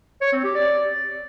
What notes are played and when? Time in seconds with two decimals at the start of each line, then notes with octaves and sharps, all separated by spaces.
0.21 C#5
0.33 C4
0.44 G4
0.55 D5